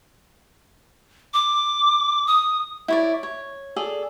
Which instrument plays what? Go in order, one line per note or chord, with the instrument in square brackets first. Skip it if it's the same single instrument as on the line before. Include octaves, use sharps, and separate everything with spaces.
[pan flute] D6
D#6
[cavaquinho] E4 C#5 D5
C#5
G#4 A4 D5